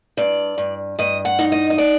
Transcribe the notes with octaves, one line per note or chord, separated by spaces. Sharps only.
G2 D5
G2
G2 D#5
F#5
D#4
D#5
D#5
D5